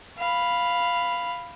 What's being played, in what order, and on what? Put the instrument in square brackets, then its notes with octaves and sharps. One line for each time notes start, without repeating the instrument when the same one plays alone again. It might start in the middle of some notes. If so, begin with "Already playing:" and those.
[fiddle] F5 B5